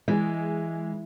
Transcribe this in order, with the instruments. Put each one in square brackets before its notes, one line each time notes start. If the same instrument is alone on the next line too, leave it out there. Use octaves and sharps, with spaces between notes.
[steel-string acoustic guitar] E3 [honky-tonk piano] G#3